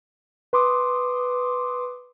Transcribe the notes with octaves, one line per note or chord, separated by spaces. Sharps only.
B4 C6 D6 D#6